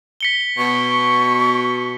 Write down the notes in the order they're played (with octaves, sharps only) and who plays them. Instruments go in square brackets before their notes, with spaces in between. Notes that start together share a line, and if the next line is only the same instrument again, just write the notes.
[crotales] B6 C#7 G7
[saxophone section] B2 [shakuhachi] C#6